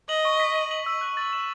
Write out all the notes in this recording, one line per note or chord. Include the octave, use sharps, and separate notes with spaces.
D#5 F#7
C#6
B6
D#7
F#7
E6
F#6
A6
E7